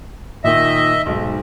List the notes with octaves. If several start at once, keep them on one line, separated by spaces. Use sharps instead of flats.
A#2 D#3 D#5 E5
B1 G#2